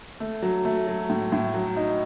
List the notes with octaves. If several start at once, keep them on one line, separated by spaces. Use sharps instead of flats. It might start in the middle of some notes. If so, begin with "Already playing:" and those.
A3
F#3
A3
F#3
A2
A2
F#3
D#4